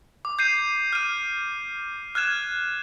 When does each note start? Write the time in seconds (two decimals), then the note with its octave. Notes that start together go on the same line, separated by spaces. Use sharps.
0.25 D6
0.39 G6 C7 D#7
0.93 F6 D#7
2.15 F6 F#6 G#6 E7